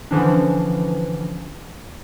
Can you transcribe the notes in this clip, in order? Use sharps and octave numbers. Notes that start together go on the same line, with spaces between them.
D3 E3 F3 C#4 D4